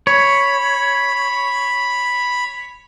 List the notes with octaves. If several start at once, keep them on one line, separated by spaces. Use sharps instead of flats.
C#5 B5